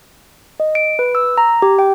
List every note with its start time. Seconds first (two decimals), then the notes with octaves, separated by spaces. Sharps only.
0.60 D#5
0.75 D7
0.99 B4
1.15 E6
1.38 A#5
1.62 G4
1.79 G5